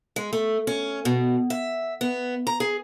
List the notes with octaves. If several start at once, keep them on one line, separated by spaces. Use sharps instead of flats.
G#3
A3
C#4
B2
E5
B3
A#5
G#4